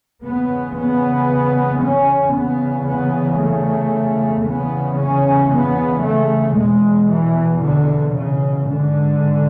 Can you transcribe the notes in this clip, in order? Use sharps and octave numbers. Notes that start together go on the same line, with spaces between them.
E2 C#3 B3
B3
C#4
E2 C#3 B3
B3
A3
E2 C#3 B3
C#4
B3
A3
E2 B2 G#3
E3
D3
C#3
G#2 D3